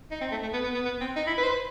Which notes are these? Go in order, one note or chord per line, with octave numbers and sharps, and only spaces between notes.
D#4
C4
A3
A3
B3
B3
B3
B3
C4
D#4
E4
B4
C5
B4